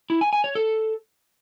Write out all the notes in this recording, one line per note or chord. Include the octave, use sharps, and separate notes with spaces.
E4
G#5
G#5
C#5
A4